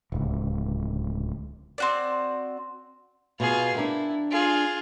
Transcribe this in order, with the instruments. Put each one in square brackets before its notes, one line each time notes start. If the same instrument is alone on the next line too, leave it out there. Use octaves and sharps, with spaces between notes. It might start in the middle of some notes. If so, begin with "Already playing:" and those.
[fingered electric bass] D1 C#2
[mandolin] C4 F#4 D5
[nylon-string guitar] B2 [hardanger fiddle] F4 G#4
[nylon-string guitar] D4 A#4 G5 [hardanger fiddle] E4
[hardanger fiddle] F4 G#4